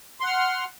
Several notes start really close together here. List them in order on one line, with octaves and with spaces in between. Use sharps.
C6 F#5 F6